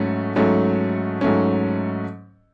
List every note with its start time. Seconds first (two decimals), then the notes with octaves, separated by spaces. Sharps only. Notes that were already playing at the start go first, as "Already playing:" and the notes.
Already playing: G#2 F#3 A3 C#4
0.36 G#2 F#3 A3 C#4
1.21 G#2 F#3 A3 C#4